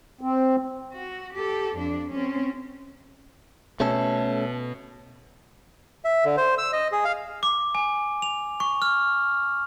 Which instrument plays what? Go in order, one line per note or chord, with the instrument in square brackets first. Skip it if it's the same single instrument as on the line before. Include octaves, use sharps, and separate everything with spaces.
[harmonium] C4
[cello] F#4
G4 A4
F2 D4
C4 C#4
[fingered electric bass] B2 [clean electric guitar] A3 C#4 A4
[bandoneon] E5
D3
C5
E6
D#5
G#4
F5
[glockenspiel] D6
G#5
F7
C#6
F6